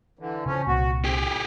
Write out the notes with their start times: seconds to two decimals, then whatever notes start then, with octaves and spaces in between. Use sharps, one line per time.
0.19 D3 E3
0.46 C#3 F3 C#4
0.67 C2 A#2 F#4
1.04 C4 G4 G#4
1.24 C#3